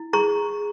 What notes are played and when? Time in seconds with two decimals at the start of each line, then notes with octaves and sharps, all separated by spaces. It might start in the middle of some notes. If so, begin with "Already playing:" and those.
Already playing: E4
0.13 G#4 A#5 C#6